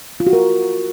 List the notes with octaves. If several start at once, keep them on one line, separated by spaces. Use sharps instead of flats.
F4
F#4
A#4